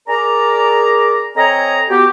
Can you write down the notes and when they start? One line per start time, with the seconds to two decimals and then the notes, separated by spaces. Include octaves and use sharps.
0.08 G#4 A#4 D5 A#5
1.36 C4 A4 C#5 D#5 G#5 A#5
1.89 B3 F#4 G4